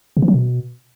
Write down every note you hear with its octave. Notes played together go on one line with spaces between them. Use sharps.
C3
E3
F#3
B2